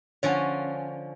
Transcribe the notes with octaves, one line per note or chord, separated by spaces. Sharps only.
D3 F3 C#4 C#5 G#5